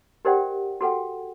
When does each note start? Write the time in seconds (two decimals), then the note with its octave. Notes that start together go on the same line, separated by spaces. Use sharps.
0.25 G4 A#4 C5 D5 F#5 G5
0.81 F#4 A4 F#5 G5